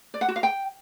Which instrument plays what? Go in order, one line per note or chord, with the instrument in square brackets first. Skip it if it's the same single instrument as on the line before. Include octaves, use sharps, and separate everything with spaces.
[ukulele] D5
F#5
F#4
F5
G5